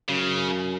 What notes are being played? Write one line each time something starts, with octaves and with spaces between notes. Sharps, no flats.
F#2 C#3